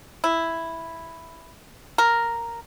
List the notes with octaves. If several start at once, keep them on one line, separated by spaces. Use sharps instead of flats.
E4
A#4